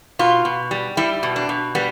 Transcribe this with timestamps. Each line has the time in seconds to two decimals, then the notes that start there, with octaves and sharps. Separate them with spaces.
0.19 B2 F4
0.45 B2
0.71 G3
0.97 G3 E4
1.23 B2
1.36 D4
1.49 B2
1.75 G3 B3